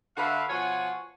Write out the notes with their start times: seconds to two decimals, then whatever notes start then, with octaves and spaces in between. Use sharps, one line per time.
0.17 D3 F#4 B4 E5 F5
0.49 B2 F3 C#5 F#5 G#5